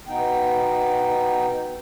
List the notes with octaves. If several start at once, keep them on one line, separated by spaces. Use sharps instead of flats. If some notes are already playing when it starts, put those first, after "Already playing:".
B2 B3 D#4 G5